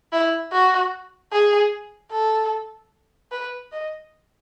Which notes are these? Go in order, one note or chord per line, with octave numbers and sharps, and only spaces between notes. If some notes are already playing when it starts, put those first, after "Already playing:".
E4
F#4
G#4
A4
B4
D#5